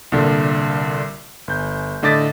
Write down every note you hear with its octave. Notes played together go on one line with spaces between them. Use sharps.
C2 A#2 D3
G1 G6
A2 D3 D#5 D6 A6 B6